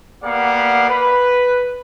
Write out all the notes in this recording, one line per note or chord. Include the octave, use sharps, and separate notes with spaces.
A#3 B3 G4 D5 F5 F#5
B4